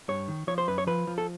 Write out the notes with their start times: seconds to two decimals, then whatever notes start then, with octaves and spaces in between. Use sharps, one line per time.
0.08 G2 C#5
0.28 D#3
0.47 F3 C#5
0.58 C5
0.68 F#2 B4
0.78 C#5
0.87 F3 B4
1.07 F3
1.18 A4